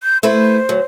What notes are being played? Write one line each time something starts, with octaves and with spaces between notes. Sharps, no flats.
G6
A3 E4 B4 C5
D2 F#3